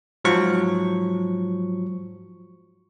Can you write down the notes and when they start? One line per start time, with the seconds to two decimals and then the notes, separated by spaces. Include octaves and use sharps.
0.24 G#2 F3 F#3 C#6